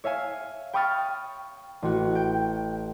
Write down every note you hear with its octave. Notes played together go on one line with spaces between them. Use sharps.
C#5 E5 F5 G#5
G5 B5 C#6 D#6 F6 A6
A1 F#4
G5